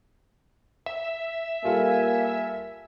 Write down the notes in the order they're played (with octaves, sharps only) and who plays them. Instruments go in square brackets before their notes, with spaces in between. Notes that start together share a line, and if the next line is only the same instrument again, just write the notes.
[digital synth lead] E5
[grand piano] G3 F4 A4 [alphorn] A#3 [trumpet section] G#5